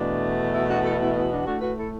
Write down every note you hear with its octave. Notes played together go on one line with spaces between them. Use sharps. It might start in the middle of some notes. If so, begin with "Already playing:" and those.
Already playing: E2 B2 A3 D4
B3 E4
D4 F#4
E4 A4
B3 E4
B3 E4
D4 F#4
A2 A3 D4 F#4
F#4 B4
E4 A4